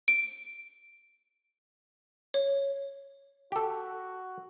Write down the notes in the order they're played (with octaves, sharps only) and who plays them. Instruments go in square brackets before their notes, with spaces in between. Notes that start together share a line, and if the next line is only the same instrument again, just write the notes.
[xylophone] D7
C#5
[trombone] F#4 [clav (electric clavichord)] G4 A4